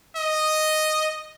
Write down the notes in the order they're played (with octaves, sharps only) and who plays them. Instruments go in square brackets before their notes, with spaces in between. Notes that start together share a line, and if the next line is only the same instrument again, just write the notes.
[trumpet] D#5